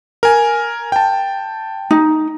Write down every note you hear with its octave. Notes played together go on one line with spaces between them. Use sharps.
A#4 G#5
G5 A5
D#4